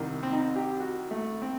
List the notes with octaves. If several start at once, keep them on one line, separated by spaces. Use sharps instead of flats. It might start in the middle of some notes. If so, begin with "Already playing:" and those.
Already playing: C2 C3 D#3
C4
D#4
G4
F#4
A3
C4